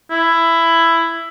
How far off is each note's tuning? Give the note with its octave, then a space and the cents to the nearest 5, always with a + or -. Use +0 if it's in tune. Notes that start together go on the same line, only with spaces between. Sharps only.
E4 +10